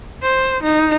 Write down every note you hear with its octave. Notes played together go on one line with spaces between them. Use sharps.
C5
D#4